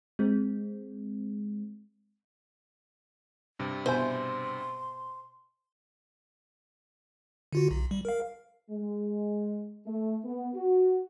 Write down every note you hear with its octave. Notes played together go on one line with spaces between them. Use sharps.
G#3 C4
G2 C3
B2 C5 E5 G#5 C6
D3 F4 F#4
B1
G3
A#4 F5
G#3
A3
B3
F#4